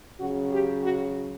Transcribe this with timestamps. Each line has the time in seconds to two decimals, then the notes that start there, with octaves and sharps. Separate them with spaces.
0.19 C#3 F#3 F#4
0.51 G4
0.82 F#4